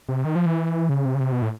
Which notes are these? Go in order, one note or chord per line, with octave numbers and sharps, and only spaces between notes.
C3
D#3
F3
E3
C#3
C3
C#3
C3
B2
A2